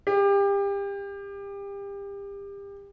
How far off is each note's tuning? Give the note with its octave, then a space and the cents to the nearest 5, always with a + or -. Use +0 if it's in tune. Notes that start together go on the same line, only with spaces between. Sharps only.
G4 +30